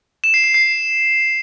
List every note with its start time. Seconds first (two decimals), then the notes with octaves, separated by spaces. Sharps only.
0.24 E7
0.34 C7
0.44 C7
0.54 C7